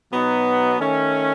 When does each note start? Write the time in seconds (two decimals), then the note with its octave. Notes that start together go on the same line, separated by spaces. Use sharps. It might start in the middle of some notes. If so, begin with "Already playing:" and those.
0.11 B2 F#3 B3 D#4
0.79 D#3 A3 C#4